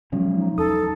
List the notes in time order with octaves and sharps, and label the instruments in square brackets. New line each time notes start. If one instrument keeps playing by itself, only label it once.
[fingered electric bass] B2 C#4 [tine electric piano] F3 F#3 G#3
[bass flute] D#4
[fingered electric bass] E2 [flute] A4 [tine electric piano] D#6